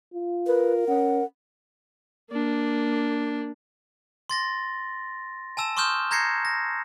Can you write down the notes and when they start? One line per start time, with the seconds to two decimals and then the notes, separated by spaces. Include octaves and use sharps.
0.14 F4
0.47 A#4 B4
0.88 C#4 F#5
2.31 A#3 D4
4.30 C6 A6 A#6
5.57 G#5 A5 E6 E7
5.77 C6 C#6 D#6 F6 G6 E7
6.11 A#5 G6 G#6 A#6 C7 C#7
6.45 A#6